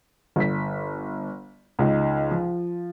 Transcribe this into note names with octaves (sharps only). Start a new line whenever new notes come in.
G1 B6
C#2 D#4
F3